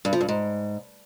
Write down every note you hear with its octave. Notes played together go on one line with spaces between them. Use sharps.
G2
F3
G2
G#2